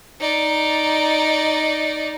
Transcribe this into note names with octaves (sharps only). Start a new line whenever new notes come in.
D#4 D5